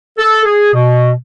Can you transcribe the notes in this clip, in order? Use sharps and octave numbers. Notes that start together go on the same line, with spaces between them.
A4
G#4
B2